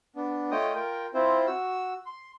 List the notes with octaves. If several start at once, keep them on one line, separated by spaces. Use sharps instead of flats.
B3 D4
A3 F4 C#5 D#5 G5 D#6
F4 A#4 G5
C4 E4 F4 C5
F#4 E6
C6